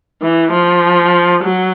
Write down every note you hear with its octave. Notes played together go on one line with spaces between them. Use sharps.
E3
F3
F#3